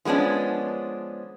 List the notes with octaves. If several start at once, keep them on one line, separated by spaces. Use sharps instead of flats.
F3 G#3 B3 C#4 D4